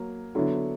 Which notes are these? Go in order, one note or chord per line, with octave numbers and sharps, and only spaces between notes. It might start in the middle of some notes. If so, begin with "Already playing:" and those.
Already playing: F#3 A#3
D3 F#3 B3 E4